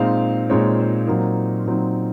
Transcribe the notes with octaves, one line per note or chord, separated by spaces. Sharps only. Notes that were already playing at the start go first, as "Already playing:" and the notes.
Already playing: A#2 G#3 C4 D#4 F5
A#2 G#3 C4 D#4 C#5
C5
A#2 F#3 C4 D#4 A#4
A#2 F#3 C4 D#4